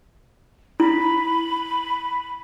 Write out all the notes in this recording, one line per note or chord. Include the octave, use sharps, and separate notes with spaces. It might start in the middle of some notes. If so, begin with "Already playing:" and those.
E4 B5